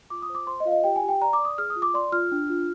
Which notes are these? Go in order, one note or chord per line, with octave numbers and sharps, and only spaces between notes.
F4 D6
D#6
C5
D6
C5 C6
D#5
F4 F5
D#5
G4 G5
G#5
G4
G5
D5 A#5
D6
D5
D#6
G#4 F6
D#6
F4
D6
D5 C6
F4 F6
D4
F4